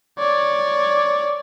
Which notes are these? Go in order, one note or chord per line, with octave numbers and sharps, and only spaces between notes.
C#5 D5